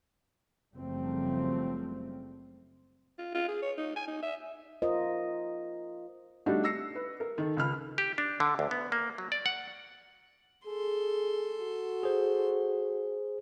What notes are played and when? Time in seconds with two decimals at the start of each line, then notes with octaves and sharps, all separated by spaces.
0.75 F#1 F#2 F3 G3 A3 C4
3.18 F4
3.35 F4
3.48 G#4
3.62 C#5
3.78 D#4
3.96 G#5
4.07 D#4
4.23 E5
4.82 F4 A#4 C5 D#5
6.46 G3 A3 D4 D#4 F#4 G4
6.64 E6 A#6 C7 C#7
6.95 B4
7.20 A#4
7.38 D#3 A4
7.57 C#2 B5 F6
7.98 G4
8.18 D4
8.40 D3
8.59 D2
8.71 B3
8.92 A#3
9.18 F#3
9.32 D5
9.46 F#5
10.66 G#4 A4 C6
11.61 F#4
12.03 G#4 C5